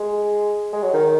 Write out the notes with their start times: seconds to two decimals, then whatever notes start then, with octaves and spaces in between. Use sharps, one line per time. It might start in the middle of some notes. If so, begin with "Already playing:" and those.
Already playing: G#3
0.73 G#3
0.83 F#3
0.93 D#3